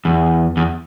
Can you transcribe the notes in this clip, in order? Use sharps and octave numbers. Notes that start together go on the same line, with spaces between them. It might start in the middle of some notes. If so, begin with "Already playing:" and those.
E2
E2